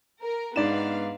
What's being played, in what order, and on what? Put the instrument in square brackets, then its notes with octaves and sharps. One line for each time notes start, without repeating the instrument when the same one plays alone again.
[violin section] A#4
[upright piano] G#2 D5 E7 [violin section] B3 F5 [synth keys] D4 D#4